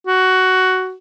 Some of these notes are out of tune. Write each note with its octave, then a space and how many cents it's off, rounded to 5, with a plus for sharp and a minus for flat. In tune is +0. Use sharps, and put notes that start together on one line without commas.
F#4 +10